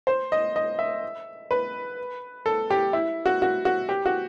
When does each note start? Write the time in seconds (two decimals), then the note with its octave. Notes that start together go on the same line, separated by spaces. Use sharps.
0.07 C5
0.32 D#5
0.56 D#5
0.79 E5
1.51 B4
2.46 A4
2.70 G4
2.93 E4
3.26 F#4
3.42 F#4
3.65 F#4
3.89 G4
4.06 F#4